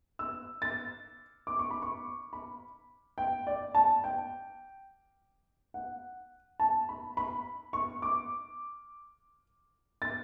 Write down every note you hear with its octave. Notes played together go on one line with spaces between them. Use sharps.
E6
A6
D6
C#6
B5
C#6
B5
G5
D5
A5
G5
F#5
A5
B5
B5
C#6
D6
A6